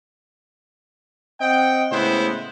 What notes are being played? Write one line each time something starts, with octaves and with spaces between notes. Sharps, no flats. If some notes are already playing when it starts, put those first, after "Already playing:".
C4 D#5 F#5 G5
A2 C#3 G#3 B3 E4 C5